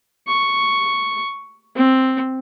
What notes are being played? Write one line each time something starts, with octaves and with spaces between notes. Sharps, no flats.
C#6
C4